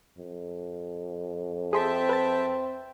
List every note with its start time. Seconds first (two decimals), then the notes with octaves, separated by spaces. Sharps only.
0.18 F2
1.73 C4 G#4 E5 G5 A5 C6 B6
2.09 B4 A6